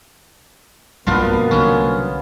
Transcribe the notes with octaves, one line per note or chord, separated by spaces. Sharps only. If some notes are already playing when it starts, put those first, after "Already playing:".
B1 G2 B2 F3 A#3 B3 D4 F4
C2 D3 F#3 C#4